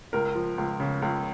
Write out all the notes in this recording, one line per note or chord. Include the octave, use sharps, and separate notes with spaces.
C#2 A#4
F3
C#2
C#3
C#2